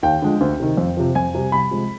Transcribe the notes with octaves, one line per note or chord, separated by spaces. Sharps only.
D#2 G5
D3 F3 G#3
D2
C3 D#3
F2
C3 F3
F2 G#5
C3 G3
C2 B5
C3 F3 G#3